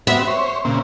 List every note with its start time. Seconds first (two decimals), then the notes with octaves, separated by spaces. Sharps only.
0.07 B3 C4 F#4 E5
0.28 C5 C#5
0.65 A#2 C#3 C4